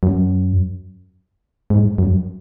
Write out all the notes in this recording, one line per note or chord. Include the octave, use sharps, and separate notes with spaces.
F#2
G#2
F#2